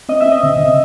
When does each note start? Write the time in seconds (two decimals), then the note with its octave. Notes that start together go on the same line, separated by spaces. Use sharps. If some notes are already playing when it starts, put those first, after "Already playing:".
0.09 C4 D#5
0.21 E5
0.26 C4
0.32 D#5
0.43 C#3
0.60 C#3